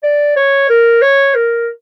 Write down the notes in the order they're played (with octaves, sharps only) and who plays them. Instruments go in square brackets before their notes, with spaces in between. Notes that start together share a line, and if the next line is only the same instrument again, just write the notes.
[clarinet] D5
C#5
A#4
C#5
A#4